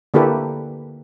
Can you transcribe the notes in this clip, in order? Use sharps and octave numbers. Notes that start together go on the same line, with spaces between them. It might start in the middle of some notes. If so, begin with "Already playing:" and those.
D3 A#3 E4 G4 A4 B4